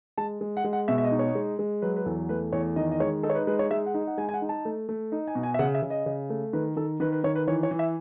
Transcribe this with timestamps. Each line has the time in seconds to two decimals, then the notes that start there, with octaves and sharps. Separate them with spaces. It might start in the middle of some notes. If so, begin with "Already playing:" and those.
0.18 G#3 A5
0.41 G#3
0.57 F#5
0.64 G#3
0.73 F#5
0.88 B2 E5
0.98 E5
1.04 D#5
1.11 D#4
1.19 C#5
1.35 G#3
1.59 G#3
1.82 F#3 B4
1.96 B4
2.06 E2 A4
2.29 A3 B4
2.53 E2 C#5
2.76 D#3 D#5
2.91 D#5
3.00 G#3 C#5
3.23 D#4 A4
3.30 C#5
3.35 B4
3.47 G#3 B4
3.59 C#5
3.71 G#3 E5
3.86 F#5
3.94 D#4
4.07 F#5
4.18 G#3 G#5
4.29 G#5
4.34 F#5
4.42 D#4
4.49 A5
4.65 A3
4.89 A3
5.12 D#4
5.28 G#5
5.35 B2
5.43 G#5
5.54 E5
5.59 C#3 F#5
5.75 E5
5.82 C#3
5.90 D#5
6.06 C#3
6.30 A3
6.53 D#3 B4
6.77 D#3 A4
7.00 D#3 B4
7.12 B4
7.24 D#3 C#5
7.35 B4
7.47 E3 C#5
7.63 C#5
7.71 E3
7.79 E5